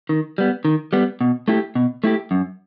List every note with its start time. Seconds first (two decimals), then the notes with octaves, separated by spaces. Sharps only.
0.09 D#3
0.38 G3 B3
0.65 D#3
0.93 G3 B3
1.21 B2
1.48 A3 E4 G4
1.75 B2
2.04 A3 E4 G4
2.31 F#2